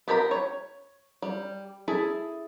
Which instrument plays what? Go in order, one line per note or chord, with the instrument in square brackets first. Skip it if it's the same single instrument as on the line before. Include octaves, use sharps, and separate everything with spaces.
[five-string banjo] B3 G4 A#4 A5 B5
C#5
G3
E4 G#4 A4